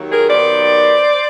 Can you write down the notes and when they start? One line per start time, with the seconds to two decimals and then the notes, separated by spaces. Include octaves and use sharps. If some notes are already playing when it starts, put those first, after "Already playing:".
Already playing: D#2 D#3 F#3
0.11 G#4 A#4
0.28 D#2 D#3 F#3 B3 C5 D5